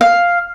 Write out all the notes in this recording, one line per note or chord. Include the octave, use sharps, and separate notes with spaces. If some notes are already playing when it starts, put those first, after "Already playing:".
F5